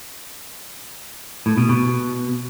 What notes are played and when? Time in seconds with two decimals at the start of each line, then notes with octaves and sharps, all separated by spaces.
1.46 A2
1.58 B2
1.69 B2